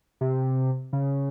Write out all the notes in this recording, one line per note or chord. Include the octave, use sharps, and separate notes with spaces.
C3
C#3